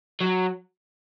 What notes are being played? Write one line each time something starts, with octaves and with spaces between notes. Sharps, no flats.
F#3